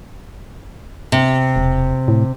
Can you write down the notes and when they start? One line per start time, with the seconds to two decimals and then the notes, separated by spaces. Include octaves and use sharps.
1.12 C3
1.56 E1
2.08 A2